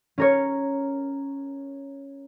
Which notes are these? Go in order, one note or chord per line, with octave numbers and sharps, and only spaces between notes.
C#4 A#4 C#5